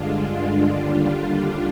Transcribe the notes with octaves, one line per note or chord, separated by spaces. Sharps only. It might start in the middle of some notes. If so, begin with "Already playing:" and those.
Already playing: G2 D3 G#3 D4 F4
D#2 D3 G3 D4 F4